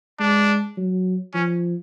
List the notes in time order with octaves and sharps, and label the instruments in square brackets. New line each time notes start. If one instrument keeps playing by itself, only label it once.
[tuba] G#3 [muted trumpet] D4
[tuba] F#3
[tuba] F3 [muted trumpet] C#4